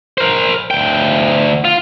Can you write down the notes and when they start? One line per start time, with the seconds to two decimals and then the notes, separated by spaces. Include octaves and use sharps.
0.18 A#4 C5
0.71 D2 G5
1.65 F4